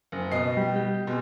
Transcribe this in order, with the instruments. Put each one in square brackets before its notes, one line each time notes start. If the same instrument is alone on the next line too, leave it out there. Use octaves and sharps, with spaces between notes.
[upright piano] F#1
B2 D#5 C7
[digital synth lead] G3
G4
[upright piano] B2 G#3